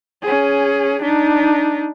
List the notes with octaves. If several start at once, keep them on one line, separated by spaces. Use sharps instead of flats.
C#4 G#4
D4 D#4